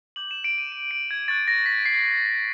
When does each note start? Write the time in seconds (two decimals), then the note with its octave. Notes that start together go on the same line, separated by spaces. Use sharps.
0.16 D6 G6 F#7
0.31 E7
0.44 D7
0.58 D#7
0.72 E7
0.91 D7
1.11 G#6
1.28 C#6 F#6 A6
1.48 A#6
1.66 B6
1.86 C7